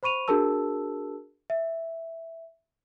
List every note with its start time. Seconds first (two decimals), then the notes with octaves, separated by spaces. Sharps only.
0.03 C5 B5 C#6 D#7 F7
0.28 D4 F#4 G#4 A#4 A5 E6
1.50 E5